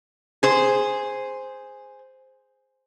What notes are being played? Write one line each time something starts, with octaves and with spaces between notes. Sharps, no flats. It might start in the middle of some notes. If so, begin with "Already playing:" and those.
G#4 C5